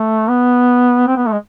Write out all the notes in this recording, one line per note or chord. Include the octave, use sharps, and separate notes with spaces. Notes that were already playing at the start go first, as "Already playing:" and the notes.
Already playing: A3
B3
C4
B3
A3
G#3